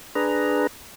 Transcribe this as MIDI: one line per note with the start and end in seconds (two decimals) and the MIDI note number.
0.15 0.67 62
0.15 0.67 68
0.15 0.67 71
0.15 0.67 82